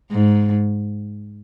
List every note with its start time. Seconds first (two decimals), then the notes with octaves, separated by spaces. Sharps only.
0.11 G#2